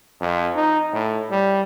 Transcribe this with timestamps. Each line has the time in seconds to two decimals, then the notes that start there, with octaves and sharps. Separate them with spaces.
0.21 F2
0.55 D#4
0.93 A2
1.31 G3